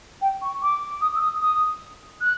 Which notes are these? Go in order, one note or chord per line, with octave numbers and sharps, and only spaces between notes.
G5
C#6
D6
D#6
E6
D#6
D#6
F#6